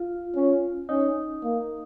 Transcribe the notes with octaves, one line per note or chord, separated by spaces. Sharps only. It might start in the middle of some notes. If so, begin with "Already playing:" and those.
Already playing: F4
C#4
C#4 D#4
A#3